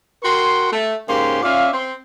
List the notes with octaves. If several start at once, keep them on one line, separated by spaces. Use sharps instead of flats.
F#4 A#4 G5 C6
A3
G#2 C#3 A#3 C#4 G4 C6
C#4 F4 D5 E5 F5
C4 C6